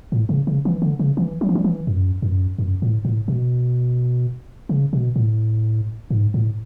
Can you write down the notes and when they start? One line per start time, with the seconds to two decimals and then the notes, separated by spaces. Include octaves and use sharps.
0.12 A2
0.29 C#3
0.47 C#3
0.65 E3
0.82 D3
0.99 C#3
1.17 E3
1.41 F#3
1.49 E3
1.55 F#3
1.64 E3
1.87 F#2
2.22 F#2
2.58 F#2
2.82 A2
3.05 A2
3.28 B2
4.69 C#3
4.93 B2
5.16 A2
6.10 G#2
6.34 A2